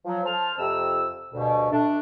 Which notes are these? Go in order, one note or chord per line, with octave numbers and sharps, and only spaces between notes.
F3 F#3
C5 A5 F6
F2 C3 E6
D2 G2 B2
A3 D4